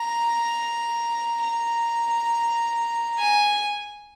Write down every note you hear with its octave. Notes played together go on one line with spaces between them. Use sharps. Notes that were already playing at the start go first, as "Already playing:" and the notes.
Already playing: A#5
A#5
G#5